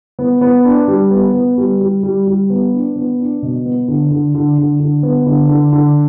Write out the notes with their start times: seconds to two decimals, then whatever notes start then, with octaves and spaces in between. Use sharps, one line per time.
0.19 B3
0.41 B3
0.65 D4
0.88 G3
1.11 B3
1.34 B3
1.58 G3
1.81 G3
2.03 G3
2.27 G3
2.50 B3
2.73 D4
2.96 B3
3.19 D4
3.42 B2
3.66 B3
3.88 D3
4.11 D3
4.35 D3
4.58 D3
4.80 D3
5.03 B3
5.26 D3
5.49 D3
5.72 D3